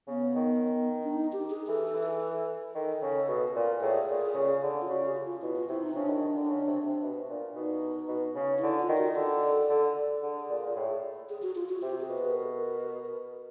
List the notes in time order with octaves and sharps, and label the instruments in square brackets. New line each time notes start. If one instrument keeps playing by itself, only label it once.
[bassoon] C#3 [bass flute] B3
[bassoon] D#3
[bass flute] D4
D#4
G4
G#4
[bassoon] E3 [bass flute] A4
[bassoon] E3
[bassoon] D#3 [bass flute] A4
[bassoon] C#3
B2
A#2
[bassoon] A2 [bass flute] G#4
[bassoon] A#2
C#3
D3
[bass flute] F4
[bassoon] C#3 [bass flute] F#4
[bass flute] G4
F4
[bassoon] B2 [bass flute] E4
[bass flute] F4
[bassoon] C3 [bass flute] E4
[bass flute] D#4
[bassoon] C#3 [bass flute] D4
[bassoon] D#3
D#3
D3
C#3
C3
C3
B2
A#2
[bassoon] B2 [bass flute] D#4
[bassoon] B2
C#3
[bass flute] D#4
[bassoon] D3 [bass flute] E4
[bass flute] F4
[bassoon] D#3
[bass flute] F#4
[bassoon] D3 [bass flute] A4
[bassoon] D3
[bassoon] D3 [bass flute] G#4
[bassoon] A#2
A#2
A2
[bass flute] G#4
F#4
F4
F#4
[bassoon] C3 [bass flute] G4
[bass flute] G#4
[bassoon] B2
[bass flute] B4
A#4
A4
A#4